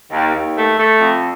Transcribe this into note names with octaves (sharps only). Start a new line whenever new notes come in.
D#2
D#2
A3
A3
F2